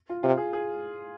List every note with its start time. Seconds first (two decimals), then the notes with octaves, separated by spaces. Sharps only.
0.09 F4
0.23 C3 F4
0.37 G#4
0.53 G#4